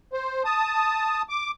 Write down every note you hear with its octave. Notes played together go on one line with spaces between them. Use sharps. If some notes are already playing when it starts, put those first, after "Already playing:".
C5
A5 D#6
D6